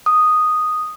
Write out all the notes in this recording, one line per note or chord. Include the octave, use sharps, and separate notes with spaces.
D#6